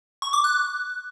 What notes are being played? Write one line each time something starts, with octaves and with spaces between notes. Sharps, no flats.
C#6
D6
F#6